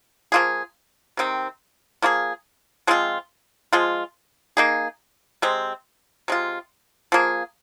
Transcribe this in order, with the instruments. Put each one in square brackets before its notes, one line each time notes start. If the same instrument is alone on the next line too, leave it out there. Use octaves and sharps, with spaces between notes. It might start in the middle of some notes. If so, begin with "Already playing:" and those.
[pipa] F3 A#3 F4 G#4
C3 D#3 C4
F3 A#3 F4 G#4
F3 G#3 C4 F4
F3 G#3 F4
A#3 D#4 G#4
C3 G#3 C4
C3 G#3 F4
F3 A#3 G#4